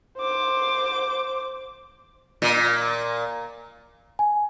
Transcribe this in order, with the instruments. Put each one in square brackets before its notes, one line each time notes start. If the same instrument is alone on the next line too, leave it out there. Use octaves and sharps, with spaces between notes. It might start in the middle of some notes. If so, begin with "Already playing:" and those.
[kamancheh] C5 D6
[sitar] A#2
[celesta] G#5